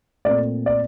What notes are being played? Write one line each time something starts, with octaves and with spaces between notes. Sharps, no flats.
A#2 A3 C4 D5
D5